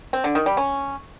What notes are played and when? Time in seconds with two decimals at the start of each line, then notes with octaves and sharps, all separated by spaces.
0.13 C4
0.24 D3
0.35 D#3
0.46 G3
0.57 C#4